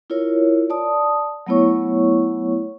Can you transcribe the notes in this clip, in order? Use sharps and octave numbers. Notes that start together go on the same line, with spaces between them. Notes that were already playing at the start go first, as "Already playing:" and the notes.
E4 F4 A#4 C#5
D5 A5 D#6
F#3 A3 B3 E4 C#5 C#6